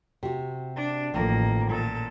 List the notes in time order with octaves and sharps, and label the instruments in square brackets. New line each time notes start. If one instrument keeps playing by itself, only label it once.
[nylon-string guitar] C3 F#4
[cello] D4
[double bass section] A1 [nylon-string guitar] D#3 F3 A3 [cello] A#3
[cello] A#2 A4